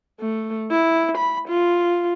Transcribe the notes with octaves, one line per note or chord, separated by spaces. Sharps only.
A3
E4
B5
F4